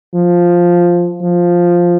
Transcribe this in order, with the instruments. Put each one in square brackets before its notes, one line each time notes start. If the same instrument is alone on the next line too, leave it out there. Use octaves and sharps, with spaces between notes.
[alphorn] F3
F3